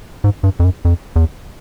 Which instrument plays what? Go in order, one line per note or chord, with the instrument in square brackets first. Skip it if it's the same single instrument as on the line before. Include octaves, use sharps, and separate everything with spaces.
[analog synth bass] G#2
G2
F2
F#2
F2
E2